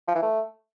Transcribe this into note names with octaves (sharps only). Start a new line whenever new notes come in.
F3
E3
A3